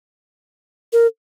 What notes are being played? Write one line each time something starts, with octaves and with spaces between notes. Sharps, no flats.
A#4